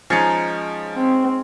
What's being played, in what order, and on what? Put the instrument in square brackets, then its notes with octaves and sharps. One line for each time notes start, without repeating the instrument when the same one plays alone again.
[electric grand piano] F3 A6 C#7 [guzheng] G#3 D#4 [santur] C#4
[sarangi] C4